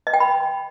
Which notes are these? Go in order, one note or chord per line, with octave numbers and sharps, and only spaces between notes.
D#5
G5
B5